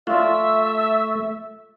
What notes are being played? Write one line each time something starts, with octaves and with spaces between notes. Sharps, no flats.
A3 F4 D5 E5